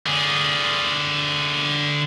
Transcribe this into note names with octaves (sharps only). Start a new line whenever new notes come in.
D3 G#4